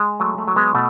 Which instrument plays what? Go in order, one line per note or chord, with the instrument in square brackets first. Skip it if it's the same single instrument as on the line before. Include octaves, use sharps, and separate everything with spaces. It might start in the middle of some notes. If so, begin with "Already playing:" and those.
Already playing: [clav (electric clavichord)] G#3
F#3 A3
A3
F#3
G#3 B3
B2 A3